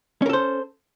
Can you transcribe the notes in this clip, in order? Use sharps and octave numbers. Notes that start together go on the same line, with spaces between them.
C#4 A4 A#4 C5